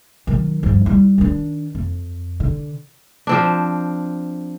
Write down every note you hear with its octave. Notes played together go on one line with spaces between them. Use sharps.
D#3 F#3
G2 F3
G3 E4
D#3 D4
F2
D3
F3 C4 D4